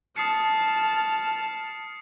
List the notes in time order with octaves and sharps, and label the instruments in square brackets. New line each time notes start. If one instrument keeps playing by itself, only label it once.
[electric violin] A5 F6 [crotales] D#6 C7 C#7